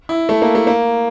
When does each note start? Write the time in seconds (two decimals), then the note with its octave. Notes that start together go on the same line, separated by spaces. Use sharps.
0.09 E4
0.29 A3
0.42 A#3
0.55 A3
0.67 A#3